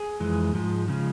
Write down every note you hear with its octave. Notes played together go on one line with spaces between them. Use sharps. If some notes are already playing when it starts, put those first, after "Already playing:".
Already playing: G#4
F2 E3 G#3
G#2 F3 G#3
C#3 F3 G#3